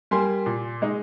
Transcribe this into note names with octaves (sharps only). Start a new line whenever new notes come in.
G3 A#3 G#5 C6
A#2
G#3 D#4